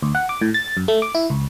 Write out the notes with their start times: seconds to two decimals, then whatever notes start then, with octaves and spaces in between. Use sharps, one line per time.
0.02 D2
0.15 F#5
0.29 D6
0.41 A2
0.54 A6
0.77 F#2
0.88 A3
1.02 D6
1.15 E4
1.30 C#2